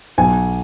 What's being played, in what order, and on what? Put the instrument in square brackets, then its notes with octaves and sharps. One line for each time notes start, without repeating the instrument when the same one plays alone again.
[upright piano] B1 G#5